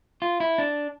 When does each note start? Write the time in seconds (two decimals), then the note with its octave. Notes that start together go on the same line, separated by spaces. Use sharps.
0.22 F4
0.40 E4
0.58 D4